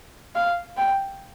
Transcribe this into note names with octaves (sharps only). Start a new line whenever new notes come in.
F5
G5